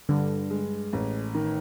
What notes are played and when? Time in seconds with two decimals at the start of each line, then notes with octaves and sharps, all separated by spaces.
0.09 G2 D3
0.50 G#3
0.93 A1
1.35 D#3